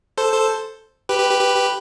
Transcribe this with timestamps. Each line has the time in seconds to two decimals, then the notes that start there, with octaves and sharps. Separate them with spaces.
0.18 A4 C5
0.32 A4 C5
1.09 G4 B4
1.19 G4 B4
1.30 G4 B4
1.40 G4 B4
1.55 G4 B4